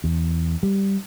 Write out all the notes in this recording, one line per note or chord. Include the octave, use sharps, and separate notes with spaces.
E2
G3